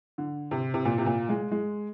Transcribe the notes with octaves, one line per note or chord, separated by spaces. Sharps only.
D3
C3
C3
A#2
C3
A#2
G#3
G#3